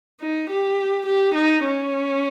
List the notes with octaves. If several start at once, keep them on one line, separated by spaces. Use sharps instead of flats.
D#4
G4
G4
D#4
C#4